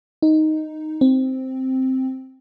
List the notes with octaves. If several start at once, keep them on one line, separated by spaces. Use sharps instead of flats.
D#4
C4